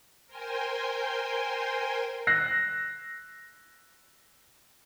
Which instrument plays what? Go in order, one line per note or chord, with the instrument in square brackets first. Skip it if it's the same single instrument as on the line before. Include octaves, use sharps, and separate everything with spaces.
[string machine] A#4 C5 G5 G#5 C6
[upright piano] E6 F#6 A#6 C7